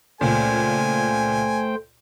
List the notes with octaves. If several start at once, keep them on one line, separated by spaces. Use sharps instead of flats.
C#2 A#2 A3 C5 G5 G#5